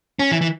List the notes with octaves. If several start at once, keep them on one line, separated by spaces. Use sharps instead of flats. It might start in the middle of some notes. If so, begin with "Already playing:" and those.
C#4
E3
E3